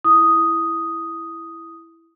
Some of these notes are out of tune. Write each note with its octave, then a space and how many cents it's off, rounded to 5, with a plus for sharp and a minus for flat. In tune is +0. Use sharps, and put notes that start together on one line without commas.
E4 +5 D#6 +0